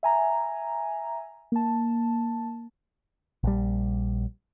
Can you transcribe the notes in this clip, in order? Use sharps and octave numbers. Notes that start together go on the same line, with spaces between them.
E5 G#5 A#5
A#3 A5
A#1 G3